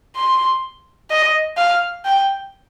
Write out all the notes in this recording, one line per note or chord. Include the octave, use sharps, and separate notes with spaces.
C6
D#5
F5
G5